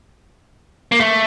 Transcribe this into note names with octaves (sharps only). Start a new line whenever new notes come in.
A#3
A3